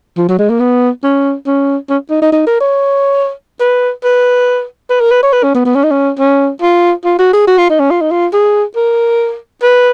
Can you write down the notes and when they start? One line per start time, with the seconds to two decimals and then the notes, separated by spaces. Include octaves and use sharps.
0.17 F3
0.28 F#3
0.39 G#3
0.50 A#3
0.60 B3
1.04 C#4
1.47 C#4
1.90 C#4
2.10 D#4
2.22 D#4
2.32 D#4
2.47 A#4
2.61 C#5
3.60 B4
4.04 B4
4.90 B4
5.00 A#4
5.11 B4
5.23 C#5
5.32 B4
5.43 C#4
5.55 B3
5.65 B3
5.75 C#4
5.84 D#4
5.91 C#4
6.19 C#4
6.62 F4
7.05 F4
7.19 F#4
7.33 G#4
7.47 F#4
7.58 F4
7.70 D#4
7.80 C#4
7.91 F4
8.02 D#4
8.11 F4
8.33 G#4
8.76 A#4
9.62 B4